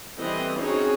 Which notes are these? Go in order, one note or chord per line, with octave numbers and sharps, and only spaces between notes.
E3 G3 C4 A4 D#5
C4 C#4 D#4 F#4 G#4 C#5